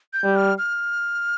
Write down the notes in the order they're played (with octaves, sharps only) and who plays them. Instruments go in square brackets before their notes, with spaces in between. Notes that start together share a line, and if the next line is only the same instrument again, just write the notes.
[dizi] G6
[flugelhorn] G3
[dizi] F6
F6